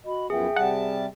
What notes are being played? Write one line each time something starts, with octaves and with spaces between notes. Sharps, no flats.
F#4 D#5 B5
F#2 F3 B3 G#4 E5 G5
C3 G3 F#5 A5